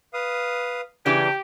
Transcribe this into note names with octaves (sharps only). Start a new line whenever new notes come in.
B4 F5 D#6
C#3 E3 D4 G4 G#5
G5